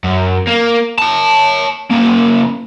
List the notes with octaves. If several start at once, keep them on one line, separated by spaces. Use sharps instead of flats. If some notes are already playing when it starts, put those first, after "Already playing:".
F#2
A#3
C#5 A5
C#3 A#3